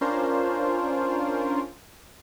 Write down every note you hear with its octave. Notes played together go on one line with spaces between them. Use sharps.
C#4 D4 F4 A#4 C5